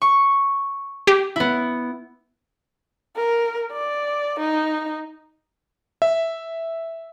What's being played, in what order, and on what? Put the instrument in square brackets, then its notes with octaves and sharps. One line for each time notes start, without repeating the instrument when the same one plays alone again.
[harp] C#6
[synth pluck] G4
[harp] B3 E4
[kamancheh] A#4
D5
D#4
[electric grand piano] E5